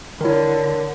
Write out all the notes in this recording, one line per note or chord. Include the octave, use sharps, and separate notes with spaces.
D3 D#3 E4 A#4 C#5